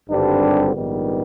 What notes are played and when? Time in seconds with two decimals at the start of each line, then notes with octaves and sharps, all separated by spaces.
0.09 G#1 G2 D3 G3 C4 D4
0.74 A#1 G#2 D#3 G3 B3